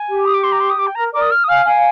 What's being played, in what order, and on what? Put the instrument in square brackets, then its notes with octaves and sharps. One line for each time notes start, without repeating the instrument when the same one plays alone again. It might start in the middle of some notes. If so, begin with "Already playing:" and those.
Already playing: [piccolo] G#5
[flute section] G4
[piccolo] D#6
D6
C6
A#5
C6
D#6
D6
G5
[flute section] A#4 [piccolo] A#5
[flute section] A#4 D5 [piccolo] D6
[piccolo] D#6
F6
D#6
[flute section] F5 G#5 [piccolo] F6
[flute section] F5 G#5